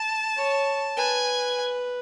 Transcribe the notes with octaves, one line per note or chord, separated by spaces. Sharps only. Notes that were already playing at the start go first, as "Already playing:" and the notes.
Already playing: A5
C#5
B4 G#5